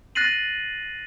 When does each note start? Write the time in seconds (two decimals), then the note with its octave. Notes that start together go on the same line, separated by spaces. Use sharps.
0.15 F#6 A6 A#6 C7 D#7 F#7